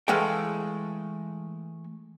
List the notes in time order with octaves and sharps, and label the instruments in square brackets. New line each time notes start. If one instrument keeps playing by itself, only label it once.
[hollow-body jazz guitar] E3 G#3 A3 F5 G5